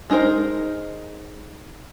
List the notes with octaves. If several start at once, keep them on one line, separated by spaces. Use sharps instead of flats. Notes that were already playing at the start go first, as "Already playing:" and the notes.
G#3 D#4 G#4 A#4 C5